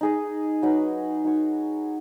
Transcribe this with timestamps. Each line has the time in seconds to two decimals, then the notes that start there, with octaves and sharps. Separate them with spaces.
0.01 D#4 G#4 D#5
0.63 F#3 D#4 B4
1.24 D#4 F#4 C#5